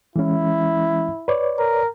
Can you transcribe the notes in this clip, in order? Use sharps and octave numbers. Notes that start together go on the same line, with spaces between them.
E3 G#3 C#4 E4
B4 C#5 D5
A#4